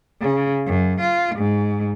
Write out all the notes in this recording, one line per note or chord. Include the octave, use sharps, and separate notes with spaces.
C#3
F#2
F4
G#2